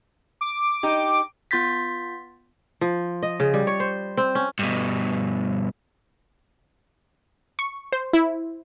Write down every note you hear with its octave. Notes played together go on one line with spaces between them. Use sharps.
D6
D#4 G4
B3 F4 C6 G6 A6 B6
F3
D#5
C#3
G3
C#5
C5
C4
C#4
G2 B2
C#6
C5
E4